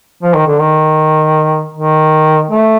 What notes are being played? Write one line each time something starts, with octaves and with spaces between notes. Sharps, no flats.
F3
D#3
D3
D#3
D#3
A3